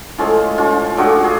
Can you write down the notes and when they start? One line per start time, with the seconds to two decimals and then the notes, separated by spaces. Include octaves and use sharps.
0.18 A2 F3 G#3 C#4 F4
0.58 C#4 F4
0.97 A2 F3 G#3 D4 F#4
1.24 F4 G#4